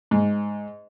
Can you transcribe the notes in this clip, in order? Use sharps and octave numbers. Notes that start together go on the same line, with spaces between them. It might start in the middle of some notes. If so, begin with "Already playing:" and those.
G#2